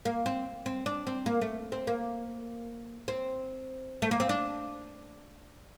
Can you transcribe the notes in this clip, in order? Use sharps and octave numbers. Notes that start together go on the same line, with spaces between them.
A#3
C4
C4
D4
C4
A#3
A3
C4
A#3
C4
A3
A#3
C4
D4